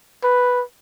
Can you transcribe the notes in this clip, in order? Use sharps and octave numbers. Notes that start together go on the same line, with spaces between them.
B4